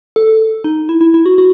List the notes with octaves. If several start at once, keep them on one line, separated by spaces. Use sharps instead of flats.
A4
D#4
E4
E4
E4
F#4
F#4